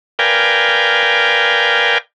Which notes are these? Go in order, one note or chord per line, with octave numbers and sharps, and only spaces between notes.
A#4 B4 D5 F5 G5 G#5